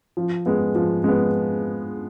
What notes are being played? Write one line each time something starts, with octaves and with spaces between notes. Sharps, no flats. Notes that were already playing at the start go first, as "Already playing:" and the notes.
F3
G#3 B3
F3
G#3 B3